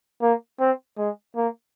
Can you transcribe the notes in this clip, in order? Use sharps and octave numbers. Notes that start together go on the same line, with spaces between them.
A#3
C4
G#3
A#3